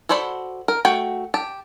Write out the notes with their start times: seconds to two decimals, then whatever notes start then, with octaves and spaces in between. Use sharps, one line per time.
0.09 F#4 A4 C5 D5 B5
0.68 A#4
0.85 A3 F#4 G5
1.34 G4 A5